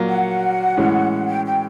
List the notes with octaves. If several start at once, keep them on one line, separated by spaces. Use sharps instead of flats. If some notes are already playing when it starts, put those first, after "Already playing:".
Already playing: A#2 F#3 A#3
F#5
A2 E3 G#3 C#4
G5
G5